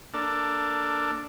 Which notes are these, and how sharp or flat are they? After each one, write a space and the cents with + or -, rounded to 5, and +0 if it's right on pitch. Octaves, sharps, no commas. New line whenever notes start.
A#3 +0 D4 +0 A4 +15